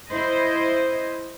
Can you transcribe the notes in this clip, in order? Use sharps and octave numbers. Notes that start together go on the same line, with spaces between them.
E4 C5 D#5